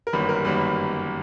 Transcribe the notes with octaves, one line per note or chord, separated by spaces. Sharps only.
A#4
G1 F#2 D#3 G3 A#3 B4
A#4
G1 F#2 D#3 G3 A#3 B4
B4